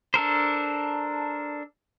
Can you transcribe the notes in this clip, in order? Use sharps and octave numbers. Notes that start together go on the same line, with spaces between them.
D4 A4 A#4 C5